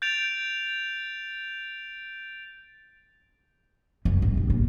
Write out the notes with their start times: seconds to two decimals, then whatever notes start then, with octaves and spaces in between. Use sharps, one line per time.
0.02 G6 A6 D7 F7
4.05 F#2
4.22 A1
4.37 A#1
4.50 A#2